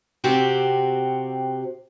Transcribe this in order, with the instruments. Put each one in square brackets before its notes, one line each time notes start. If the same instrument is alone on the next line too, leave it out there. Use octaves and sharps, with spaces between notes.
[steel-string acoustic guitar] C3 C4 F#4 G4